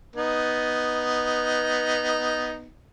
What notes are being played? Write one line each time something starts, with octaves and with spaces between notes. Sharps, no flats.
B3 D#4